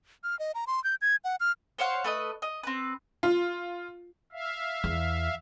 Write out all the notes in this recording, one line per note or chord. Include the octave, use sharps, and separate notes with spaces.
F6
D#5
A#5
C6
G6
G#6
F#5
F6
C5 C#5 F5 F#5
A3 B4 D#5
D#5
C4 B4
F4
E5 F5
E2